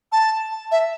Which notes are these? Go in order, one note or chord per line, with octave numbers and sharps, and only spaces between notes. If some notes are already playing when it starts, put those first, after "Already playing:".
A5
E5